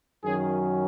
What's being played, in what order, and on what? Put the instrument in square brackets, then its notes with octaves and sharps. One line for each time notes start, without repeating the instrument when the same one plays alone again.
[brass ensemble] F#2 D#3 F#3 C#4 G#4